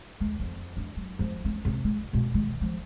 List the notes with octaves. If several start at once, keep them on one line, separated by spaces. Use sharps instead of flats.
D#2
F2
D4
F#3
F3
C#4
C3
A#3
B2
D#3
F3